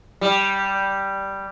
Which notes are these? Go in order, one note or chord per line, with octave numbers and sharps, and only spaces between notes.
G3